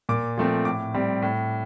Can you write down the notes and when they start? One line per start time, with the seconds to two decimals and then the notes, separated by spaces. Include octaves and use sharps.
0.09 A#2 D6
0.38 F3 A3 C4
0.65 A2 D6
0.94 G3 C4
1.22 A2